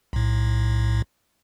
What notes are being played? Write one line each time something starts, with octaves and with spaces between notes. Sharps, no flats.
B1 A2